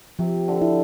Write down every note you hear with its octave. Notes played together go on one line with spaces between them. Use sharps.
C3 F3
D3
E4